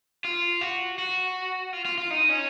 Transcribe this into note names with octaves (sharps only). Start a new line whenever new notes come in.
F4
F#4
F#4
F4
F4
F4
D#4
C#4